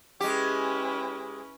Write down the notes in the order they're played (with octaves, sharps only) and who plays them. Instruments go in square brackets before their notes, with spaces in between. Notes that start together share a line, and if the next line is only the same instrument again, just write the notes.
[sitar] G#3 G4 [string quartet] C#4 E4 B4